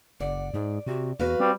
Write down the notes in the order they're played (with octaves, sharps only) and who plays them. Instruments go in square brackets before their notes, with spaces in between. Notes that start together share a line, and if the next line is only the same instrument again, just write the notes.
[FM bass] F#1 [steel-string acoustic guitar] D5 [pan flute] F#5
[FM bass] G#2 [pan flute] G#4
[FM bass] C3 [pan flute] F#4
[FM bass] E2 [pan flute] F#4 [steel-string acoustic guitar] B4 F5
[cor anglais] G3 [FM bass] C4